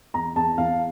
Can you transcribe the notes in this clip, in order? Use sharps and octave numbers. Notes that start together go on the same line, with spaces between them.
E2 A#5
E2 A5
E2 F5